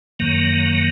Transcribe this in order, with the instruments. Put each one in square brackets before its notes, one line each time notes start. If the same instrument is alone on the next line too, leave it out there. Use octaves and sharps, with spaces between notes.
[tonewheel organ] F#2 D#3 F#3 A#3